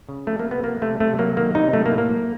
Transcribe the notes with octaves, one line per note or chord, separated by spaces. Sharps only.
C#3
F3 A3
A#3
C3
B3
F3 A#3
C3 A3
C3 A3
F#3 A#3
D#3 A#3
C3 D#4
F#3 A3
A#3
A2
A#3
F#3